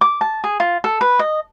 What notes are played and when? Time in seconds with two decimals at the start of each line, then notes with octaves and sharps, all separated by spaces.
0.01 D6
0.21 A5
0.44 G#4
0.60 F4
0.84 A4
1.01 B4
1.19 D#5